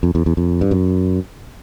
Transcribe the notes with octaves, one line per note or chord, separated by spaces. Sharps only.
F2
E2
E2
F2
G2
F#2